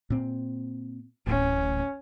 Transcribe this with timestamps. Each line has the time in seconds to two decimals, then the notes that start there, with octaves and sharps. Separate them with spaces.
0.10 A#2 C4
1.27 D1 A1 C#4